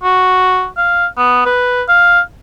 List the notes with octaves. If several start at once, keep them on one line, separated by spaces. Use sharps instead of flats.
F#4
F5
B3
B4
F5